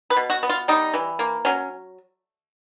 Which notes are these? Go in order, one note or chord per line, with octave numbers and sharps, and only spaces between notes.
B4
B2
F#4
B3
F4
G3 D#4
E3
A#3
F#3 C#4